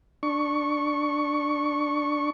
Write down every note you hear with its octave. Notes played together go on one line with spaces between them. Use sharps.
D4 C#6